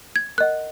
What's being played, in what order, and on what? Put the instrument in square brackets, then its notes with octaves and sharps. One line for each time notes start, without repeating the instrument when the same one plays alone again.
[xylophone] G#6
A#4 D#5 F#5 F#6